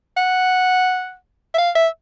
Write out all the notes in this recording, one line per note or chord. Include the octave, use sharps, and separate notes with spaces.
F#5
E5
F5
E5